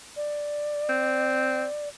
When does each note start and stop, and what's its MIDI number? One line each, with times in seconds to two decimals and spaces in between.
0.16 1.89 74
0.89 1.64 60